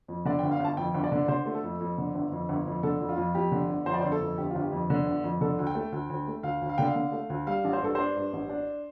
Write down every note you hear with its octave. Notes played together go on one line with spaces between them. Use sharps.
F2
D3 D5
G1 G5
F5
G1 A5
F2 G5
G1
D5
D3
D3 C5
A3
A4
F2
F2
D3
G1
F2
G1
F2
D3 A4
F2
F4
F2
F2 G4
D3
G1
F2 C5
D5
G1 C5
A4
F2
G1 G4
G1 F4
G4
F2
D3
G1
F2
D3 A4
D2
G5
A3
D2
D2
A3
D2 F5
D2
F5
D3 G5
F5
D3
A3
D2
G3 F5
A1
C5
G2 A4
D4 C5
G2
A1
D4